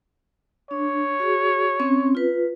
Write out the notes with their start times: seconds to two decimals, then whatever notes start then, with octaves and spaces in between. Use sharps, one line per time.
0.71 D4 C#5
1.20 F#4 G#4
1.80 C4 C#4
2.15 F4 B4